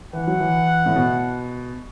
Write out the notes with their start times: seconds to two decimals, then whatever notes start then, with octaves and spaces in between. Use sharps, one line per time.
0.13 E3 F#5
0.27 F#3
0.40 E3
0.86 A2
0.96 B2